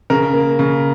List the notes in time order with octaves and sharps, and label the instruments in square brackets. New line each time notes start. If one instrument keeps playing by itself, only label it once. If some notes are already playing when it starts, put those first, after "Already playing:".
[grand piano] C#3 A#4
A#3
C#3